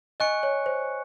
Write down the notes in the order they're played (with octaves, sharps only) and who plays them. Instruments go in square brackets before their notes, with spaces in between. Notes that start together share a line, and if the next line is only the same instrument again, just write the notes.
[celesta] D#5 [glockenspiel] G#5 C#6 F#6 C#7
[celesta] C#5
C5